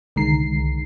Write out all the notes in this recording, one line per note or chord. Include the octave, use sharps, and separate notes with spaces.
C2 D3 D#3 G#3 A#5 C7